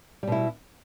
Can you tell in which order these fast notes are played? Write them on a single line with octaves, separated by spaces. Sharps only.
G3 B2 E4